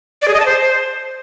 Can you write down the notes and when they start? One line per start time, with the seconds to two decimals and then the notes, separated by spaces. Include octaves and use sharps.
0.22 D5
0.28 G#4
0.34 D#5
0.40 A5
0.46 C5